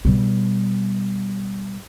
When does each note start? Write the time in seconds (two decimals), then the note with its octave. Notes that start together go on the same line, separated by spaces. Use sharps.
0.05 B2 G3